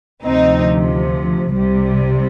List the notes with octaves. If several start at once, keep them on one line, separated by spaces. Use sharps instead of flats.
D2 C3 F3 C4 D#4
C2 C3 G3